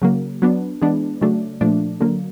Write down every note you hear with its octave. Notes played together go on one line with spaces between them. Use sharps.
C#3 F#3 A#3
F#3 B3 D4
E3 G#3 B3 D4
C#3 F#3 A3 D4
A#2 F3 A3 D4
D3 F#3 A#3